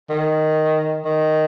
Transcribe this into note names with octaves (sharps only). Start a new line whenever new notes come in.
D#3
D#3